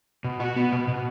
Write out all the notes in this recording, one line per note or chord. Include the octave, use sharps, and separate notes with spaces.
B2
F#4
B3
B2
B2